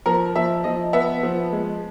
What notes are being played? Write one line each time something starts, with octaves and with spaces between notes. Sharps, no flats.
F3 A#4
F3 E5
F3 D#5
B3 E5
F3
G#3